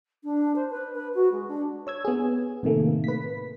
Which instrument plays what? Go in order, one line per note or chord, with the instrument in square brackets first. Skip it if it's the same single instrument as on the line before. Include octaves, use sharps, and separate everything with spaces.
[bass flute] D4
C5
B4
B4
F#4
G#3
D4
[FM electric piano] C#5 E6 G#6
B3 G#4
A2 C3 D#3 A3 A#3
B4 B6